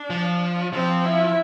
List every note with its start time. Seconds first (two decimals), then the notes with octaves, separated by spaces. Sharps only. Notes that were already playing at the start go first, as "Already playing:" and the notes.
Already playing: D4
0.10 F3
0.73 F3 C4
1.05 E4